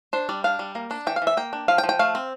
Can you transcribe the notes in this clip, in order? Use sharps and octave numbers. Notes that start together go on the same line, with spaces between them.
D4 C5
G3 D5
D4 F5
G3
A#3
D4
E3 G5
F5
E3
E5
A#3 G5
D4
F3 F5
G5
F3
G5
A3 F5
C4